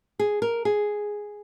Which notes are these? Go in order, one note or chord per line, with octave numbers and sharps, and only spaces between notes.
G#4
A#4
G#4